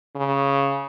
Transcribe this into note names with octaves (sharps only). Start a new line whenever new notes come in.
C#3